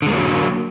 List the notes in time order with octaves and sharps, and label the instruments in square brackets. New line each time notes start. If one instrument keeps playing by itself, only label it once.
[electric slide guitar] D3
G#3
A#3
F#3